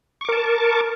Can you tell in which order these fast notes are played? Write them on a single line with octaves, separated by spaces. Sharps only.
C#6 D6 A#4 A5